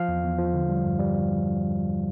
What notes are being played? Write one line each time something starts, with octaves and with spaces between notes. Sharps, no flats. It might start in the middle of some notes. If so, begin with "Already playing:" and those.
Already playing: F3 F5
E2
E2
F3
D3
G3
G2
G3